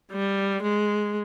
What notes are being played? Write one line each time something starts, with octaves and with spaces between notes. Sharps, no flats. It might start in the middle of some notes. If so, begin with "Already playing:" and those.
G3
G#3